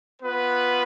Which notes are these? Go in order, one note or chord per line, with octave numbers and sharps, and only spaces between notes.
B3 F4 B4